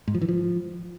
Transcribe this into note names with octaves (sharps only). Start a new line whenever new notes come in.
G#2
F3
E3
F3